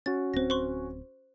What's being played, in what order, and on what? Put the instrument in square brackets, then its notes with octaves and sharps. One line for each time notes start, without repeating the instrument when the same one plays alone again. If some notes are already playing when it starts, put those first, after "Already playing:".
[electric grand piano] C#4 F#4 [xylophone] A6
[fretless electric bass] D1 C4 [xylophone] C5 A#6
[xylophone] C5 C6 C#6